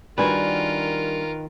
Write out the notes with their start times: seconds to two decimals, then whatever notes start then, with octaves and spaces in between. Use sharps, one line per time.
0.18 D#3 G3 D4 F4 F#4 A#4 B4 G#5